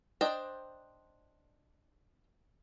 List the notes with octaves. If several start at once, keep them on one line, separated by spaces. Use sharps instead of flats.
D4 C5 D5 D#5 G5